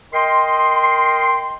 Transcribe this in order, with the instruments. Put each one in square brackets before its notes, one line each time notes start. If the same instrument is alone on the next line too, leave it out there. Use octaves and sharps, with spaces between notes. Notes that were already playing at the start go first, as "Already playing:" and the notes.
[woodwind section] A#4 D#5 G5 C6